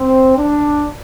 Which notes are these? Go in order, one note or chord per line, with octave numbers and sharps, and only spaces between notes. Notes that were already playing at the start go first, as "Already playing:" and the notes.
Already playing: C4
D4